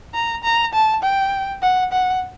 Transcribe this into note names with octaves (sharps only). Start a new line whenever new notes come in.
A#5
A#5
A5
G5
F#5
F#5